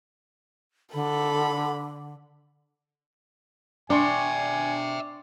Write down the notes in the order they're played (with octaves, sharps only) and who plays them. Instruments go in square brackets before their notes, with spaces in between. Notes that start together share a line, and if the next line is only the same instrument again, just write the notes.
[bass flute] D3 [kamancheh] A4 B5
[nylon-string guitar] D4 [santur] D5 C6 C#6 [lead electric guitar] E5 G5 [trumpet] G#5